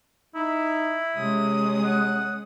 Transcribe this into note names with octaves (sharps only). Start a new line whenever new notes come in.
D#4 E4
C3 G#3 C#4 D#6
F#5